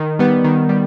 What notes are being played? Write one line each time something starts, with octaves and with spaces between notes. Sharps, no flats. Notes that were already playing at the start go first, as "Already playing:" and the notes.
Already playing: D#3
G3 B3
D#3
G3